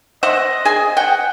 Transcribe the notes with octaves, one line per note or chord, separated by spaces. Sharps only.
C5 D#5 E5 F#5
G#4 G#5
F#5 G5